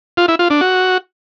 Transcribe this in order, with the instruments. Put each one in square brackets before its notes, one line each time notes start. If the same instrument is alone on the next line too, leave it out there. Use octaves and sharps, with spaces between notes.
[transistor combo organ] F4
E4
F4
D4
F#4